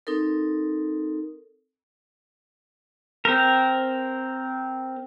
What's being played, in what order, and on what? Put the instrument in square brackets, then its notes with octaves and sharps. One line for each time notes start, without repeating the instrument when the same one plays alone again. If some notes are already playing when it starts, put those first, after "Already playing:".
[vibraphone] C4 D#4 A4 A#4
[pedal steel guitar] C4 A#4